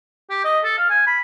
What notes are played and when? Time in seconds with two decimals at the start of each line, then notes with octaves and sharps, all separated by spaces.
0.30 G4
0.44 D#5
0.64 A4
0.78 F5
0.90 G#5
1.07 B5